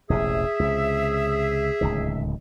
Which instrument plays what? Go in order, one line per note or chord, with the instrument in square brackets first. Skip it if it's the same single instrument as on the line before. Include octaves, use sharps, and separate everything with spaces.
[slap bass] E1 A1 C3 [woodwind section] G#4 E5
[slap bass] C#2 C3
D1 C#2 D#3